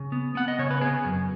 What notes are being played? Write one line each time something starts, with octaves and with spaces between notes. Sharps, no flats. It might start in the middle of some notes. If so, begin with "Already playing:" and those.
Already playing: C#3
B3
B3 F#5
D#5
C#3 C#5
B4
B3 G#4
F#2